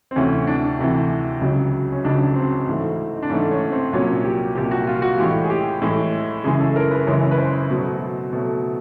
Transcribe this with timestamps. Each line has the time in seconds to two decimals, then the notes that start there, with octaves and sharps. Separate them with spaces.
0.11 C4
0.16 D2 C3 E3 C#4
0.47 D4
0.79 D2 C3 E3
1.41 C#2 C#3 F#3
1.92 C#4
2.04 C#2 C#3 F#3 D4
2.36 C4
2.67 G#2 E3 A3
3.15 D#4
3.22 D4
3.30 G#2 E3 A3 C#4
3.51 C#4
3.72 C4
3.93 C2 A#2 F#3 C#4
4.24 G4
4.55 C2 A#2 F#3 G4
4.71 F#4
4.87 F4
5.02 F#4
5.18 A2 E3 G#3 G4
5.44 G#4
5.50 G4
5.81 A2 E3 G#3
6.44 F#2 C#3 E3 G#3 G#4
6.60 A4
6.76 A#4
6.91 B4
7.07 F#2 C#3 E3 G#3 C#5
7.31 B4
7.38 C5
7.70 B2 F#3 A3
8.33 B2 F#3 A3